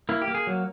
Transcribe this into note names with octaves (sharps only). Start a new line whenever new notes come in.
A#3 E4
G4
A#3
G#4
F#3